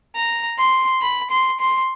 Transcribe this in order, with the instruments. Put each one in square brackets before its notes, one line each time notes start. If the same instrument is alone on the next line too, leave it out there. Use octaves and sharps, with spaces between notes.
[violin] A#5
C6
B5
C6
C6